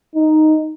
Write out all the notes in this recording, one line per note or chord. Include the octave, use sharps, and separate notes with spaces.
D#4